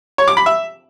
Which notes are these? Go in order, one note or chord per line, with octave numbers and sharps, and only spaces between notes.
C#5
D6
B5
E5